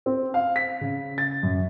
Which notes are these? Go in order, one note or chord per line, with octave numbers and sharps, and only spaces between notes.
C4
F5
B6
C#3
A6
F#2